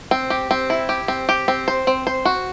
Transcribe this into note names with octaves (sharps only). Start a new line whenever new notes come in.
C4
G4
C4
E4
G4
C4
G4
C4
C5
C4
C5
F#4